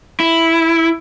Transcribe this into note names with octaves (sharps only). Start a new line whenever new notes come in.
E4